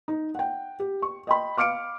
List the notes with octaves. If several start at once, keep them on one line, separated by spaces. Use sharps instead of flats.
D#4
F#5 G5
G4
C#6
D#5 G5 B5
F5 D6 F6 C#7 D7